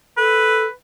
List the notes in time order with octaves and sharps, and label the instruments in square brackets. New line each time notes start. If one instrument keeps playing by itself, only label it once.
[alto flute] A4 [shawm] B4